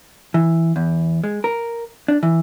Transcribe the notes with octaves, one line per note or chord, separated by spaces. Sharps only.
E3
E2
G#3
A#4
D4
E3